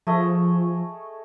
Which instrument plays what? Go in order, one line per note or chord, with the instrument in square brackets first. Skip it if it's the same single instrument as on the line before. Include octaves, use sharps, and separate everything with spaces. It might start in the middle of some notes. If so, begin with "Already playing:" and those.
[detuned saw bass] F3 [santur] A3 G#4 D#5